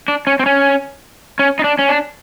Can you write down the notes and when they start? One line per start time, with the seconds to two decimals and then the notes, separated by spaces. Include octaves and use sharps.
0.08 D4
0.27 C#4
0.39 C4
0.46 C#4
1.39 C#4
1.59 D#4
1.64 D4
1.79 C#4
1.89 D4